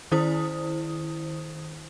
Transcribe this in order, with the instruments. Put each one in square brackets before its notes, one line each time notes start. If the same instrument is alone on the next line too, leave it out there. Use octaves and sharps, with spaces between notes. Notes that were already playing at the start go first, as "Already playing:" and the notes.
[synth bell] D#3 E4 C5 D#6